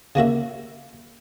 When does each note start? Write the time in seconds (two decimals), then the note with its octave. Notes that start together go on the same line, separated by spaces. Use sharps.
0.15 C#3 A#3 F#4 E5